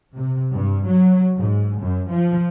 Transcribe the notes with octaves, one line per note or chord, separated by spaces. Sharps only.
C3
G2
F#3
G#2
F#2
F3